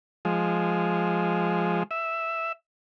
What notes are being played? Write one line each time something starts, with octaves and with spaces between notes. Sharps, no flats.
F3 G#3
E5